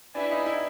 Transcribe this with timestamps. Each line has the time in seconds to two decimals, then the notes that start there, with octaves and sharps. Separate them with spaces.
0.14 D4 E4 G4 B4 E5 G#5
0.31 D#4
0.46 E4